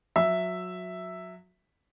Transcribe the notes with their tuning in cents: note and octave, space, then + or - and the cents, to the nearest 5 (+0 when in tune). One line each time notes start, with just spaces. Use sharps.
F#3 -20 E5 +0